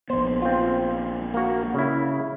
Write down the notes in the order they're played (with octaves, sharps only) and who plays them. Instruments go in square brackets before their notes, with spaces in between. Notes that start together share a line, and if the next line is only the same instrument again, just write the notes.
[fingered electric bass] A#1 B3 [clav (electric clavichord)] C5
[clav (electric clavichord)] C4 F4
A#3 F#4
C#3 E4